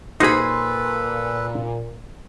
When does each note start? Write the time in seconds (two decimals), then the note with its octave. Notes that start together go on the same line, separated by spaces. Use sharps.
0.20 A#2 D#4 F#4 G#4 A4 B4 C5 B5